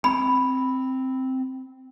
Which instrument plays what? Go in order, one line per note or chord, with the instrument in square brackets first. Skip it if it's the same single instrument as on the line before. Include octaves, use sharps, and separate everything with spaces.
[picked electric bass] C4 [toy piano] B5